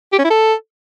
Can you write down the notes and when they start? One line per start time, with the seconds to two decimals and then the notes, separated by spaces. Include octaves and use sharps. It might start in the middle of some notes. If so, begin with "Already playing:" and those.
0.13 G4
0.19 C#4
0.25 E4
0.30 A4